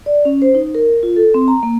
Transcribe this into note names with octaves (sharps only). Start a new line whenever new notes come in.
D5
C#4
C5
D#4
A#4
F4
A4
C4
A#5
A#3